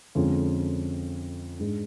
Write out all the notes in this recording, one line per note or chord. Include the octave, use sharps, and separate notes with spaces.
F2 D3 G#3 C#4 F4
G#2 G#3 D4